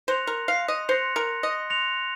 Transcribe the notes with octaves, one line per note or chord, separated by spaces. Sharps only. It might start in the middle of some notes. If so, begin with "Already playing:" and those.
C5 C6 F#6 A#6 C#7 F7
A#4
F5
D#5
C5 C6 F#6 A#6 C#7 F7
A#4
D#5
C6 F#6 A#6 C#7 F7